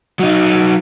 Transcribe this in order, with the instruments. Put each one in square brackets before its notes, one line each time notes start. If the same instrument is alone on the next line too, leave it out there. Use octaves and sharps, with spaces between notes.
[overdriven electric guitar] F#3 D#4